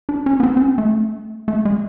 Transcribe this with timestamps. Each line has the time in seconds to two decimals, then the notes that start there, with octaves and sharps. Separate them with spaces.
0.09 D4
0.26 C#4
0.40 B3
0.43 C4
0.57 C4
0.61 C#4
0.78 A3
1.48 A3
1.65 G#3